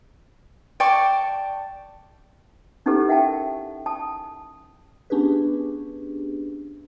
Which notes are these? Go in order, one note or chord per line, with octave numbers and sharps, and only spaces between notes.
D5 G5 A5 C#6
C#4 D#4 E4 G4 A4 B4
A#4 E5 F#5 G5 A5
A5 D#6
B3 C#4 D4 G4 G#4 B4